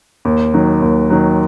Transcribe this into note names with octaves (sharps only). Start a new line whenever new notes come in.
D#2
D#3 F#3
D#2
D#3 F#3